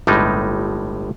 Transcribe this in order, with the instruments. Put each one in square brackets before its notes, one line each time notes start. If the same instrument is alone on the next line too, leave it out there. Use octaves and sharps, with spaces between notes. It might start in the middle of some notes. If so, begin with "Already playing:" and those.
[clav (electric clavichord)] G1 A2 G3 G#3 D#4